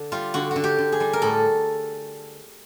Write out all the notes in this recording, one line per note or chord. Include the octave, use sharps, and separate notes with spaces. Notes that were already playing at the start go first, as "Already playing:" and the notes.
Already playing: D3
G3 F4
D3 F#4
D3 F#4
G4
D3
G#4
G3
A#4
A2 A4